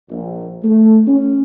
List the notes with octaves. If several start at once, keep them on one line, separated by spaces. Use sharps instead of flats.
A#1
A3
C#4